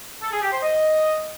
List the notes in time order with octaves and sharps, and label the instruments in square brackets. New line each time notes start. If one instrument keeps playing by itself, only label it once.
[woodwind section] A4
G#4
G4
C5
D#5